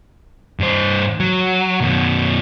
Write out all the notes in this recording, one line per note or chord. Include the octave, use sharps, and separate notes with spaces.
G2 C5
F#3
F#2 B2